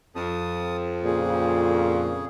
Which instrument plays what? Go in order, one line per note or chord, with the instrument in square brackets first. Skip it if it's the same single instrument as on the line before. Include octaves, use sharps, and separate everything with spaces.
[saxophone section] F2 [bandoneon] A5 D#6
[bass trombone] A#2 [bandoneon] C#3 G#4